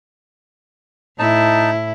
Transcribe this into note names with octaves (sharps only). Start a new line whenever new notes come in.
A2 D#4 E4 A5